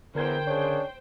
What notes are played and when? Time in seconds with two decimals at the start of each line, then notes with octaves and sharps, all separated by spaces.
0.15 E2 D3 A#4 C5 G5 G#6
0.47 C#3 D4 G#4 C#5